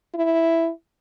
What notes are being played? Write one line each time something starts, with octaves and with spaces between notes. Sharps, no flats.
E4